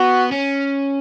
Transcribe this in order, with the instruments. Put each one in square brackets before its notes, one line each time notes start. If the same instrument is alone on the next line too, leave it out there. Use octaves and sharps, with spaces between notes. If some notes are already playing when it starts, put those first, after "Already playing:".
Already playing: [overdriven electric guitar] B3 [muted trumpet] F#4
[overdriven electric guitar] C#4